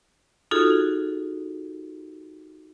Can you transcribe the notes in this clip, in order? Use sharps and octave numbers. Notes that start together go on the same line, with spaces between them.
D#4 F4 F#4 G#4 A4